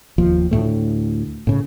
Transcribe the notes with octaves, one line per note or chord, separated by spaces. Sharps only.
F1 D#2 F3
D2 A2 A3
A2 C#3